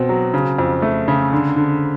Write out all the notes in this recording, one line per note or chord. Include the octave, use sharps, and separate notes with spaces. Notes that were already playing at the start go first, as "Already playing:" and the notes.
Already playing: B2 C4
F#3
C#3
F2
A3
C#3
D3
D3